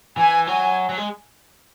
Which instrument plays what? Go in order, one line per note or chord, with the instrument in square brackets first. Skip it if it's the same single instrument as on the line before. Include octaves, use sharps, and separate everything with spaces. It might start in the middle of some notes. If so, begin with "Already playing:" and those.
[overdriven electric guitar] E3 [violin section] G#5
[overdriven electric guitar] F#3 [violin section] G#5
[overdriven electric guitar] F#3
G#3